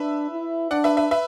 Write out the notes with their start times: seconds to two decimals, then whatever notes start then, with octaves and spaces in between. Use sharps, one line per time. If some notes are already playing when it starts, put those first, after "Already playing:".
Already playing: D4 B4 E5
0.30 E4
0.71 D4 D5 F#5
0.84 B4 E5
0.97 B4 E5
1.11 B4 E5